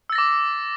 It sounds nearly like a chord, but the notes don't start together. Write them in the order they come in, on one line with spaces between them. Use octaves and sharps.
E6 A6 A#6 D6